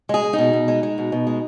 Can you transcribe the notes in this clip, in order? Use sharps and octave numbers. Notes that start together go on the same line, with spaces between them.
G#3 G#4
G#3
D#4
B2
B2
G#3
G#3
B2
B2
G#3